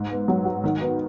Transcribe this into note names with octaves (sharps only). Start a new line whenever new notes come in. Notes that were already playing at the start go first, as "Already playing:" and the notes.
Already playing: G#2
B3
F#3
F#4
D#3
B3